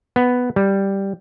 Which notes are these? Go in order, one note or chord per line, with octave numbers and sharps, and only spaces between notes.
B3
G3